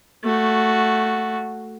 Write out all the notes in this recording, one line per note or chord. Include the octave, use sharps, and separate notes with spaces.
A3 F#4